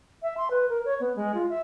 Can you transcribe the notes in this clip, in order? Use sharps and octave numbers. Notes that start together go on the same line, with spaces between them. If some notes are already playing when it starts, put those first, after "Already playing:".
E5
C6
B4
A#4
C#5
B3
G#3
F4
E5